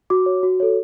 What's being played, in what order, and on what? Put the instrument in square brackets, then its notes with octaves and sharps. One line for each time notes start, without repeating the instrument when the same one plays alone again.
[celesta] F#4 D6
C#5
F#4
A4 C#5